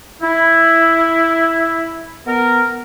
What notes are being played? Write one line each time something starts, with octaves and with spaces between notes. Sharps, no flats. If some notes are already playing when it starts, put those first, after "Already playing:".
E4
B3 A#4